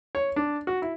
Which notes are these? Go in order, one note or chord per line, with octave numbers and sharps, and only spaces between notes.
C#5
D4
F#4
E4